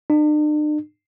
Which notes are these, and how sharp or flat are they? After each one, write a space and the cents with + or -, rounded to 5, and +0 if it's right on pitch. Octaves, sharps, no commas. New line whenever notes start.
D4 +45